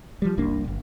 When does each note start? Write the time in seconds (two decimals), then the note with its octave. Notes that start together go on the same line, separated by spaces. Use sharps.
0.22 F3 G3
0.37 F#1 C2 A#3 D4
0.64 D1 G1